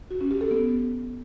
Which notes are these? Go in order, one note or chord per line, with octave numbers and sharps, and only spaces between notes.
F#4
C#4
G4
A4
B3